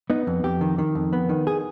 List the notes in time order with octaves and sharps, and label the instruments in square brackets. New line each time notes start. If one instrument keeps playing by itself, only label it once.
[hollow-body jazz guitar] B3 D#4
F2
F2 G4
D#3
D#3
F2
B3
D#3
G#4